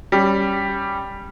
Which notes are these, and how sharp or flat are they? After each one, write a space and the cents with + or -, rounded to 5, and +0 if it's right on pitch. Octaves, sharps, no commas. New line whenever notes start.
G3 +0 C#4 +0